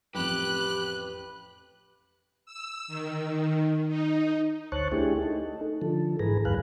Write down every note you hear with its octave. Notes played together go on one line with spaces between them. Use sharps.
A1 F2 G4 B4 F#6
E6
D#3
D#4
D2 C5 C#5 A5 C#6 F#6
A3 D4 E4 G4 G#4
D#4 A4
D3 F3 A4
G#2 E3 G#4 B4 A#5
D2 G2 G#4 B4 F5 F#6